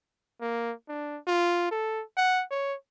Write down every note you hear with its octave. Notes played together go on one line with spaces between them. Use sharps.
A#3
D4
F4
A4
F#5
C#5